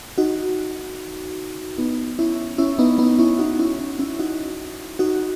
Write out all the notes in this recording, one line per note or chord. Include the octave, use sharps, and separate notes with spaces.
D#4 F#4
B3 D#4
C#4 E4
C#4 E4
B3 D#4
B3 D#4
C#4 E4
D#4 F#4
C#4 E4
C#4 E4
C#4 E4
D#4 F#4
D#4 F#4